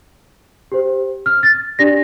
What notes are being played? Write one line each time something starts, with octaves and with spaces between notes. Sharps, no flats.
G4 C5
F6
A6
D4 G4 D5 A#6